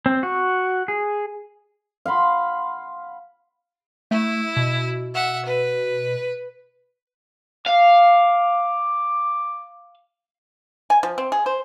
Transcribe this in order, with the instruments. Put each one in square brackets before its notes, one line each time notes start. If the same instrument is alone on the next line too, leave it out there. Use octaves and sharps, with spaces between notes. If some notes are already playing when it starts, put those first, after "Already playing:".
[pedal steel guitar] C4
F#4
G#4
[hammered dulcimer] F5 F#5 B5 C6
[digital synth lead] A3 [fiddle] E4
[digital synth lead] B2
[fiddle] E5 F#5
B4
[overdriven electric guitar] F5 [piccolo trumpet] D6
[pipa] G#5
F3
C4
G#4
C5